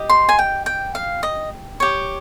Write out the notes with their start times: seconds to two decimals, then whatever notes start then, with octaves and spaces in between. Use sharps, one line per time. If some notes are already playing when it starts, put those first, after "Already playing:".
Already playing: G4 D#5
0.10 C6
0.29 G#5
0.39 G5
0.66 G5
0.95 F5
1.23 D#5
1.80 G4 C#5